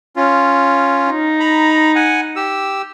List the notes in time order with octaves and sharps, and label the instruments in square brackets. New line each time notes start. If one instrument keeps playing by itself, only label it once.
[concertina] C#4 F4
[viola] D#4
[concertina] A#5 B5
F#5 G#5
G4 E6